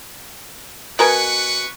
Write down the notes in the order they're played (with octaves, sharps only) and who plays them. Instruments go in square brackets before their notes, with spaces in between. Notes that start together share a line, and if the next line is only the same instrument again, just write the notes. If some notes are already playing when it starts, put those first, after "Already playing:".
[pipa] B2 A#4 G#5 [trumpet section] B4 F#5 C#6